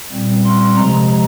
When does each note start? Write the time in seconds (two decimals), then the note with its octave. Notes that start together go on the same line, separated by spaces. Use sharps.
0.11 A#2 G3 C4
0.44 C6
0.76 C3 F3 G#3 A#5